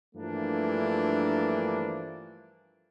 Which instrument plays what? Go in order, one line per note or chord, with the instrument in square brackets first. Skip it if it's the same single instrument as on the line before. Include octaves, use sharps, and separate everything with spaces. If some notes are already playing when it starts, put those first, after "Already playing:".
[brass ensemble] G2 E3 F3 A3 A#3 D4